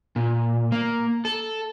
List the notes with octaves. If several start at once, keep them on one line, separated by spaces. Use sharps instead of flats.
A#2
A#3
A4